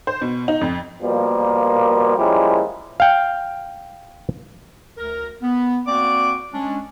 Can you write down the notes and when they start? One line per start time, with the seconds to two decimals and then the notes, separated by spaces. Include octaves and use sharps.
0.07 C5
0.22 B2
0.48 D#4
0.61 F2
1.02 B2 F3 G3 A#3
2.17 F3 G3 G#3 A#3 C#4 E4
3.00 F5 G5
4.97 D2 A#4
5.42 B3
5.86 A#3 C4 F#4 D5 D6
6.53 G#3 C#4 D4